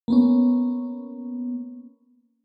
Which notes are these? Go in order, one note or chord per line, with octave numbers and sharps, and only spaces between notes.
A#3 B3 C#4